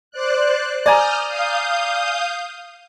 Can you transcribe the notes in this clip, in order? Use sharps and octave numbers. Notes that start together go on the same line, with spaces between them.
C5 D5 F#6
D5 G#5 A#5 D#6 F6 G6
F5 D#6 G6